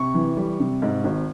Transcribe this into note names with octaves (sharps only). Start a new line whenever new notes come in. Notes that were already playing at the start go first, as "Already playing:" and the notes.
Already playing: C3 C#6
E3
G3
C3
G#2
G#1